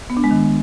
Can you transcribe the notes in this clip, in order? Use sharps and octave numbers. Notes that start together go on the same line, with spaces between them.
B3
D4
G#3
D#3